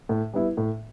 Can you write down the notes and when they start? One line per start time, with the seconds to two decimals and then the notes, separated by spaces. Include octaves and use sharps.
0.09 A2
0.33 G3 B3 E4
0.57 A2